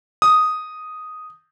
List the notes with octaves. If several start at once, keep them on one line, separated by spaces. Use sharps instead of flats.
D#6